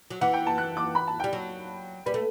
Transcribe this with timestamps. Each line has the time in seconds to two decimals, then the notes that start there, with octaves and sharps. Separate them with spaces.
0.10 F#3
0.21 E3 F#5
0.33 G5
0.47 A5
0.58 F#6
0.77 D6
0.95 B5
1.07 A5
1.20 G3 G5
1.33 F#3
2.06 G3 B4
2.14 A3